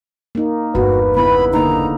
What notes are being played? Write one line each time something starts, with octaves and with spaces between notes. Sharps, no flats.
A#3 D#4
G1 E2 F#4 B4
C#3 B3 E4 B5
D3 A#3 D#4 A#5